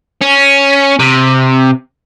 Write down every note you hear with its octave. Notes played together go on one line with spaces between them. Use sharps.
C#4
C3